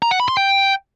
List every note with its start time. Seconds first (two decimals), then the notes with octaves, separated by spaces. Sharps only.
0.02 A#5
0.11 F#5
0.20 B5
0.28 C6
0.37 G5